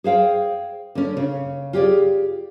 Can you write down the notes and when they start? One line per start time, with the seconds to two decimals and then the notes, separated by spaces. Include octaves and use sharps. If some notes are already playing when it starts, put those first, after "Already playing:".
0.04 G#4 C5 F5 G5
0.95 D3 C#4
1.17 C#3 C#5
1.73 F4 G4 G#4 D5